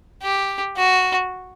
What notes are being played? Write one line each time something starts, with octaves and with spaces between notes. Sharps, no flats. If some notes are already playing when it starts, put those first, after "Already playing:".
G4
F#4